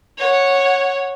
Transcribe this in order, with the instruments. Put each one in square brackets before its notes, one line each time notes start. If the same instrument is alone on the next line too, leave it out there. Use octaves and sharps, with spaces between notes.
[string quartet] C#5 F#5